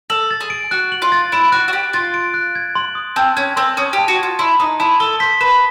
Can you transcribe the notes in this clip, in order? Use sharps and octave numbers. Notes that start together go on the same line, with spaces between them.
A4 F#7
A6
G#4
D7
F#4 F#6
F#7
F4
A6
E4 D7
F#4 F#6
F#4
G4 F#7
F4 A6
D7
F#6
G#6
C6
D#6
C4 A5
C#4 G#6
C4 C6
C#4 D#6
G4
A5
F#4
F4 G#6
E4 C6
D#4 D#6
E4 A5
A4 G7
C5 B6
B4 E7